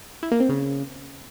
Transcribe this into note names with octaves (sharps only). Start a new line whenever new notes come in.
E4
A#3
C4
C#3